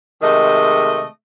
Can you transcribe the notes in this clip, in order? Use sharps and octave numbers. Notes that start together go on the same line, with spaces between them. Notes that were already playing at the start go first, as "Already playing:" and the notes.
C3 D#3 G#3 A3 D#5